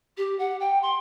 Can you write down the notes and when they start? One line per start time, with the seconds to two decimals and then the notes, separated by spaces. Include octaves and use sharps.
0.17 G4
0.38 F#5
0.60 G5
0.82 C6